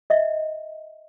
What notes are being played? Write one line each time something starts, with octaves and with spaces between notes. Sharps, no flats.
D#5 E5